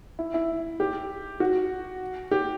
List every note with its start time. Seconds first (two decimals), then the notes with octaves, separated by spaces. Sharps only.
0.19 E4
0.34 E4
0.80 G4
1.40 F#4
2.31 G4